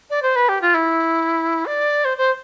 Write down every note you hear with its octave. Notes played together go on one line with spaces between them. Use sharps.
D5
C5
B4
G4
F4
E4
D5
C5
C5